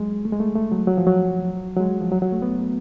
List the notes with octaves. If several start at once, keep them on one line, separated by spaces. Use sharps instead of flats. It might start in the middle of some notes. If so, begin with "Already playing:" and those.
Already playing: F#3 G#3
A3
G#3
A3
A3
F#3
F#3
F3
F#3
F#3
G#3
F3
F#3
F#3
A3
B3